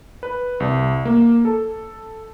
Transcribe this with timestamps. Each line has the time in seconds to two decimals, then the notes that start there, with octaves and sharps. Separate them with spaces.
0.23 B4
0.60 C2
1.05 A#3
1.45 A4